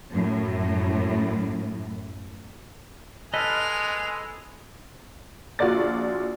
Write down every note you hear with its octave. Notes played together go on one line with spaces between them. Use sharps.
F#2 A2
G#3 A4 B4 D#5 G#5 F6 F7
A#1 F4 F#4 D5 A6